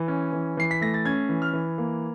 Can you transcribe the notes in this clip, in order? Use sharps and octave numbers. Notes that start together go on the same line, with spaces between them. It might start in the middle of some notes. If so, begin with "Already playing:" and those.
Already playing: E3
C#4
E3
E3 C7
B6
A3 A#6
A6
C#4 G#6
E3
F6
E3
A#3